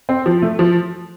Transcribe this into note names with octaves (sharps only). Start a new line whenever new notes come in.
C4
F3
A3
F3